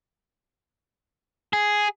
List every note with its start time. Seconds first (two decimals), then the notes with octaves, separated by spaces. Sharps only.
1.53 G#4